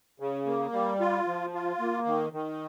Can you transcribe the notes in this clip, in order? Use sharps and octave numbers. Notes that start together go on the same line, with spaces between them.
C#3
A#3
G3
F4
F3
F4
A#3
D#3
D#3